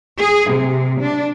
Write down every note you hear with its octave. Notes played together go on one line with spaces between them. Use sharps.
G#4
C3
D4